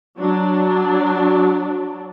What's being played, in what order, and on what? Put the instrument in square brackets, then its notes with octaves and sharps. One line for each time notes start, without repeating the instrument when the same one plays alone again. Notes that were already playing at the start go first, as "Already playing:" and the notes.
[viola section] F#3 D4